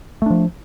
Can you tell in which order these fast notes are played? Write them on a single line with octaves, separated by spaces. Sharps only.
A3 D4 F3